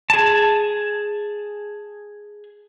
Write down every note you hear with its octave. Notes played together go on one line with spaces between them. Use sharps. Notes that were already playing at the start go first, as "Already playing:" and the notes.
G#4 A5